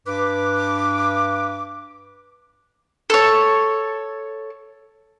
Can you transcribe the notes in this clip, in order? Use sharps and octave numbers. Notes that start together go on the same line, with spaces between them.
G2 B4 D6
A4 C#5